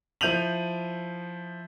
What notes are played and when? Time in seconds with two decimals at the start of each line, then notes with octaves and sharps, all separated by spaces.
0.21 F3 E4 G6 D#7 F7 F#7